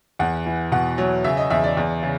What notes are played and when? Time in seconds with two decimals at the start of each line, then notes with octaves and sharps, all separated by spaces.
0.19 E2 F#5
0.46 E3
0.72 B2 F#5
0.98 F#3
1.24 C#3 E5
1.37 D#5
1.50 E2 E5
1.64 D5
1.77 E2
2.03 C#3